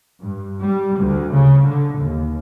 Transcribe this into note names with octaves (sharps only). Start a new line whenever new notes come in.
G2
G3
D2
C#3
D3
D#2